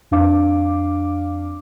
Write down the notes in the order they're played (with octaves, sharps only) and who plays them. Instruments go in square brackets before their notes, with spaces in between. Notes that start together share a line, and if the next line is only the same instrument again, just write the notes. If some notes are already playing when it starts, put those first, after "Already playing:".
[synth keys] F2 D4 F5 D6